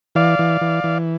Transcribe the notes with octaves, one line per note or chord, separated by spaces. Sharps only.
E3 D5 F5
E3
E3
E3